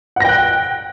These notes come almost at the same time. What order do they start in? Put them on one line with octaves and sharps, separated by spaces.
F#5 A#6 G5 F#6